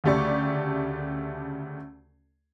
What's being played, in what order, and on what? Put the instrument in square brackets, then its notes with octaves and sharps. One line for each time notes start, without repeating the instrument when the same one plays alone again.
[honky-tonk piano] D2 C#3 A3 G4 D5 C#6